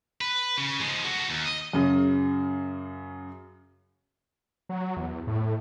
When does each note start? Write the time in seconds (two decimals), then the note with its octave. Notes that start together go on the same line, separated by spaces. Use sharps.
0.21 B4
0.58 C#3
0.80 F3 G#3
1.05 F#4 A4
1.30 D#2
1.45 D#5
1.73 F#2 C#3
4.69 F#3
4.97 E2
5.27 A2